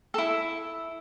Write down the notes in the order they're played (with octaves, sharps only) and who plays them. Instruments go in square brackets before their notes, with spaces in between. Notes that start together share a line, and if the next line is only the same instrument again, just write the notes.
[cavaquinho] E4 A4